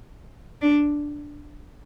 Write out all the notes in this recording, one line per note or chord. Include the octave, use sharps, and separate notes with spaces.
D4